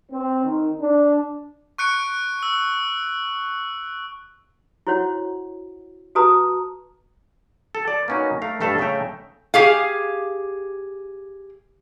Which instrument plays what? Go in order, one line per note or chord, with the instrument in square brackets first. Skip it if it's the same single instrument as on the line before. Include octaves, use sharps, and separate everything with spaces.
[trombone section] C4
D#3
D4
[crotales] C#6 F#6 C#7 D7
E6
[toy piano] E4 F#4 C5 C#5 F#5
F#4 A4 B4 A5 A#5 D#6
[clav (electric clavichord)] A4
D5
A#3 B3 C#4 D#4 F#4
A3 A#4 F5
G2 A3 A4 E5 F5
C#3 A3 G#4 E5 G5 A#5
[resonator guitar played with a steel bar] G4 G#4 F5